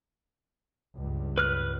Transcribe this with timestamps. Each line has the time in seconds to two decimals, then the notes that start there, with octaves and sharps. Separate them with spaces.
0.96 C#2 G2
1.38 B4 F6 F#6